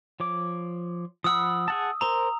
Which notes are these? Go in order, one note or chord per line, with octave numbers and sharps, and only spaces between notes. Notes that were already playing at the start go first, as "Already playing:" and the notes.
F3 C#5 D6
F3 F#5 B5 D#6 E6
G#4 F#5 A5
A#4 C5 A#5 E6